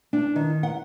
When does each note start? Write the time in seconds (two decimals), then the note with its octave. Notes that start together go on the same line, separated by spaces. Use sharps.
0.13 D4
0.36 D#3
0.63 F#5